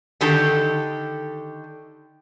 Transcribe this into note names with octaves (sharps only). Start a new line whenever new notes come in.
D3 D#3 G4 A4 A5